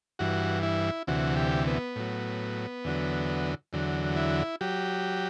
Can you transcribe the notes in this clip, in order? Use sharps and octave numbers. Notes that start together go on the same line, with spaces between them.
G2 E3 F#4
E4
D2 C3 E3 F#4
G4
B3
A2 F#3
E2 D3 F#3
E2 D3 F#3
E4
F#3 G4